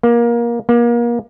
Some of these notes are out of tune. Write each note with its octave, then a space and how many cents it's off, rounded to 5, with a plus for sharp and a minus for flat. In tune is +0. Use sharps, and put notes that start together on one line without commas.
A#3 +20
A#3 +30